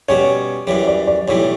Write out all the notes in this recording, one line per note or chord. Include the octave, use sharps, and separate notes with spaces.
B2 G3 C#4 C#5
F#2 E3 G3 C#5
D5
D5
B1 A2 E3 G3 C#5